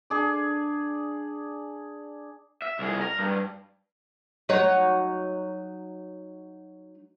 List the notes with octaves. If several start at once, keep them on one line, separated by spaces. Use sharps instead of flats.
D4 G#4 D5
E5
C2 G#4
A#4
G2
F#3 D#4 C#5